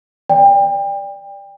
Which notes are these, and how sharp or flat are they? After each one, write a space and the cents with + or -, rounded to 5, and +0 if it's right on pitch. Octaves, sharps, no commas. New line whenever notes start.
D5 +0 G5 +30